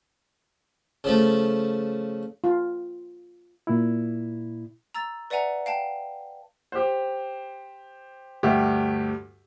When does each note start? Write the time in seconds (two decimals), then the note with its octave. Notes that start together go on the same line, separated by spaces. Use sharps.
1.04 C#3 F3 A3
2.44 F4
3.67 A#2 E4
4.94 A#5 E6 A6
5.30 B4 D5 E5 F#5 G#5 A#5
5.66 F5 G5 A5
6.72 G4 C5
8.43 D2 G2 G4 E5